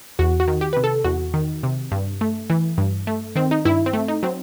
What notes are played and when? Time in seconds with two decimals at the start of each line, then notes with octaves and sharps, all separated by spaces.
0.19 E2 F#4
0.40 F#4
0.48 D#3
0.61 G4
0.73 C3 B4
0.84 A4
1.04 E2 F#4
1.34 D#3
1.63 C3
1.92 G2
2.21 A3
2.50 E3
2.78 G2
3.07 A3
3.36 D#3 C4
3.51 D#4
3.65 G2 E4
3.86 C4
3.93 A3
4.08 D#4
4.23 F#3 C4